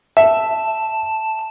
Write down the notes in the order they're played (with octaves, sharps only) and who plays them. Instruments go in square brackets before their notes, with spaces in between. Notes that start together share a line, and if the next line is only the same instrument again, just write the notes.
[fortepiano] E5 [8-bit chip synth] A5